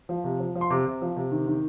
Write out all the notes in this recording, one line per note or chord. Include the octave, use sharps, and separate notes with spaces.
F3
C3
F3
F3
C6
C3 D6
C3
F3
C3
D#3
D#3